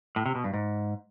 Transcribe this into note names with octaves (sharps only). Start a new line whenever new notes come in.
A2
C3
B2
G2
G#2